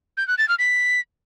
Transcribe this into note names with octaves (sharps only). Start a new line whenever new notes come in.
G6
F#6
A6
F6
B6